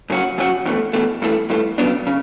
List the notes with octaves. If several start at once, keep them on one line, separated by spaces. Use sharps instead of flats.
F#2 C#3 F#3 C#4 F#4
F#2 C#3 F#3 C#4 F#4
E2 B2 A3
E2 B2 A3
G2 E3 A3
G2 E3 A3
C#3 F#3 B3 D4
C#3